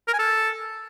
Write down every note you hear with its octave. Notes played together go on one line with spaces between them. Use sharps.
A#4
G#5
A4